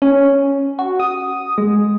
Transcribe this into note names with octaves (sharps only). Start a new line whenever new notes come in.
C#4
F#4
D#6
G#3